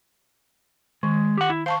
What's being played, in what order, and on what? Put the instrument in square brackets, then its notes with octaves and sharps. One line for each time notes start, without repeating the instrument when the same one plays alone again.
[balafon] D#3 [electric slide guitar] G#3
[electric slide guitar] G4 F#5
E4
[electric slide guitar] C5 [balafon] F5 A5 C#6